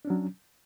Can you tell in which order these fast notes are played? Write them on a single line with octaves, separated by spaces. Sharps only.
D4 C#4 F#3